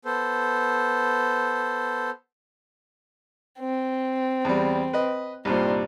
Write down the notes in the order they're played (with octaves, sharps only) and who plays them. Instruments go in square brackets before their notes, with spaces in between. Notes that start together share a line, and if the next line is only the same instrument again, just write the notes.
[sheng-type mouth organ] B3 A4 C5
[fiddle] C4
[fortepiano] E2 G3
B4 D#5
[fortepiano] C2 G2 A#2 [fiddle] D#4 C5